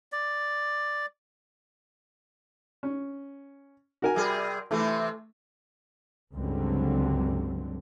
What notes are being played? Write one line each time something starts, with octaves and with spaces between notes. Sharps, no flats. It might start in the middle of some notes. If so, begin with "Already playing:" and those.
D5
C#4
F#4 A#4 G#5
C3 G3 G#4
C3 E3 A3 C4
C#2 G2 D3 F#3 G3 C4